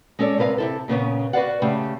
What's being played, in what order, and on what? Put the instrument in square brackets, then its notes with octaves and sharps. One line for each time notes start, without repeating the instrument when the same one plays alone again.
[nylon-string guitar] G#3 C#4 A4 C#5 D5
C3 A#4 B4 D5 F5
C3 E4 A4
A#2 C#3 B3 C#4
F#4 B4 C5 D5 F5 F#5
C#3 A3 G4